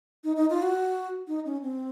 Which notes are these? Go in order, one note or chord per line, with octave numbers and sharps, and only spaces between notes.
D#4
D#4
F4
F#4
D#4
C#4
C4